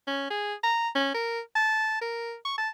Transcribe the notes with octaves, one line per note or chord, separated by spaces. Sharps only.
C#4
G#4
A#5
C#4
A#4
A5
A#4
C#6
A5